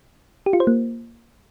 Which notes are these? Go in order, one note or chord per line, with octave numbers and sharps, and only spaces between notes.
G4
F4
C5
A#3